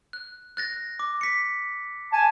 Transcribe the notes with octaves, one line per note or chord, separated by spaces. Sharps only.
F#6
F#6 A6 A#6
D6
B6 C#7
G#5 A5